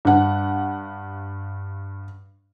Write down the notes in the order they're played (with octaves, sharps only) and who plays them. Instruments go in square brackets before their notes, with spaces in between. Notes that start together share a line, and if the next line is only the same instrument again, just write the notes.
[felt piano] G2 F#5